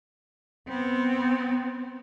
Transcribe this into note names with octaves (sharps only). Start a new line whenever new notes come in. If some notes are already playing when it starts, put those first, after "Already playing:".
B3 C4